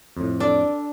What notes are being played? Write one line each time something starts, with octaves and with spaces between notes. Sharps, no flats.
F2 A2
D4 A4 D5 F5